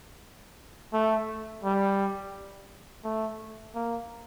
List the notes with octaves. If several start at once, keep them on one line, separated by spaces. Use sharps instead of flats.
A3
G3
A3
A#3